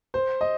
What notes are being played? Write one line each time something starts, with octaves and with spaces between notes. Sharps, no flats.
C5
D#5